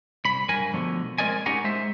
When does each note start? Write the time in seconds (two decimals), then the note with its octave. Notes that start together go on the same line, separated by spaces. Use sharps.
0.25 C2 B5
0.49 G2 F#3 A#4 G#5
0.74 B2 D3 F3 A3
1.18 G#3 C4 A#4 D5 D#5 G#5
1.46 C#4 D#4 G4 A#4 F#5 G#5
1.64 G#3 C5 E5